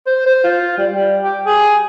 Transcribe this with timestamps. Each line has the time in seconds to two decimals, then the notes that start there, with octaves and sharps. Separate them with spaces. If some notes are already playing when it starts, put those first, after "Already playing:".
0.06 C5
0.26 C5
0.44 F4
0.77 G3
0.92 G3
1.23 G4
1.46 G#4